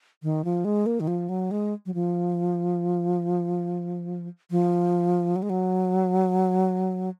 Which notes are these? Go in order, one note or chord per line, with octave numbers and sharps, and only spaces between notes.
D#3
F3
G#3
A#3
D#3
F3
F#3
G#3
F#3
F3
F3
F#3
G#3
F#3